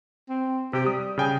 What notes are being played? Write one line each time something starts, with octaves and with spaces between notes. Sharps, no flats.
C4
C3 G4
G3 D#6
C#3 G5 G#5